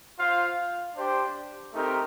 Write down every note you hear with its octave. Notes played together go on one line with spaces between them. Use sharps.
F4 C5 F5
D4 G4 C5
A3 C4 D#4 G4 A#4